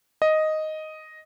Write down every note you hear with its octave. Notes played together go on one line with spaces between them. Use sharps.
D#5